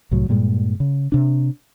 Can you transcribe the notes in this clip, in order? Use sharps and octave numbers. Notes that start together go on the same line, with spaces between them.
C2 A2 F#3
G2 A#2 G3 G#3
C#3
C3 D4